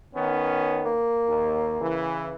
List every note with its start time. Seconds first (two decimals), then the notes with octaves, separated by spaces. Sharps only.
0.14 D#3 B3 C#4
0.85 A#3
1.27 D#2
1.80 C#3 E3